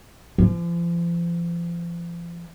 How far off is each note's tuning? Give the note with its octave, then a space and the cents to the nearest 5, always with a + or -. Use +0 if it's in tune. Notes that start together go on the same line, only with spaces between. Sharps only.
F3 -40